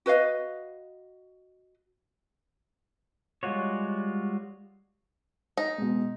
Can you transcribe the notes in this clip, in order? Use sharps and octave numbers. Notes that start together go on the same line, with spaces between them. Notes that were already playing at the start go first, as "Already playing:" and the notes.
F#4 B4 D#5 F5
G3 G#3 F4 F#4 C#5
D#4
B2 G#3